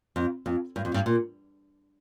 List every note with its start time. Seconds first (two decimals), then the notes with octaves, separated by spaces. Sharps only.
0.16 F2
0.46 F2
0.76 G2
0.85 F2
0.94 G2
1.06 A#2